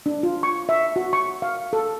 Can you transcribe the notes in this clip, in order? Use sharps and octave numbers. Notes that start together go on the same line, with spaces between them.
D4
F4
C#6
E5
F#4
C#6
F5
A4